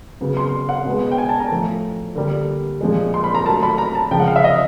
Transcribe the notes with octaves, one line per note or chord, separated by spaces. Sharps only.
C#3 F#3 B3
C6
F#5
B2 G#3 B3
G5
G#5
A5
A#5
A2 F3 A3
D3 G3 A#3
A#2 F3 G#3
C6
B5
A#5
D#3 F#3 A3 A5
B5
A#5
A5
C#3 F3 G#3 G5
F#5
F5
E5
D#5